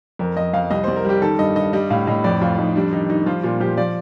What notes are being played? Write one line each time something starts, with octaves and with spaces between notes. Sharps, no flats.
F2 A#4
F2 D#5
F2 F5
C2 D#5
C2 C5
A#4
G3 G4
D#3 A4
G2 D#5
G2 D#5
G3 D#5
A2 F5
A2 D#5
F2 D5
F2 F4
F2 D#4
G3 D4
D#3 D#4
G3 D#4
F3 F4
A#2 F4
F3 G4
F3 D5